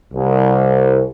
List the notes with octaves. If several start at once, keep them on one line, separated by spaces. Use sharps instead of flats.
C2